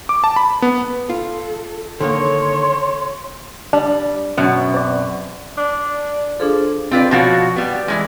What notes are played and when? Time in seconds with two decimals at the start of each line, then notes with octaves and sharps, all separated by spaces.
0.09 D6
0.24 A5
0.36 B5
0.62 B3
1.10 F4 A4
2.01 D3 D#3 A#3 A4 C#5 C6
3.73 G3 D4
4.37 F#2 B2
4.74 C4 D5
5.57 D4
6.40 F3 D4 G#4 A4
6.91 C4 F4 B4 D5
7.11 B2 F3 F#4 C#5
7.56 G3 B3
7.88 E3 F3 G#3